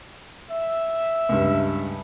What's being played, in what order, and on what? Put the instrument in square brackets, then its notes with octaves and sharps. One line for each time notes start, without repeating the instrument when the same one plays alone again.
[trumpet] E5
[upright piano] C#2 G2